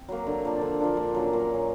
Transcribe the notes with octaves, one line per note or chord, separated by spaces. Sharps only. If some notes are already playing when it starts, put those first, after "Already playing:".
Already playing: C4
F#3 A#3
D3
F3 A#3 D4
D3
F3 A#3 D4
A#2
F#3 A#3 C#4
A#2
F#3 A#3 C#4